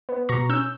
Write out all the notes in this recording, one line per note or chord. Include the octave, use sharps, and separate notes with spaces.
B3
B2 A#5 C#6
C#4 E6 G6